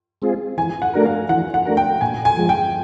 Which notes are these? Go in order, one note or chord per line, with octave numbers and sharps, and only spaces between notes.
G#3 C4 F4 G#4
E3 G#5
F#5
A3 D4 F#4 A#4
F5
E3 F#5
F#5
A3 D4 F#4 A#4
G5
A#2 G#5
G#5
F3 G#3
G5